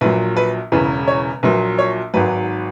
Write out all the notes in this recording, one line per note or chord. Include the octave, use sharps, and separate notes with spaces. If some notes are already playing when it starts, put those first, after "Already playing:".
A#1 A#2 F#3 B4
B4
E1 E2 C#3 E3 B4
C#5
A#1 A#2 F#3 B4
C#5
G#1 G#2 F#3 B4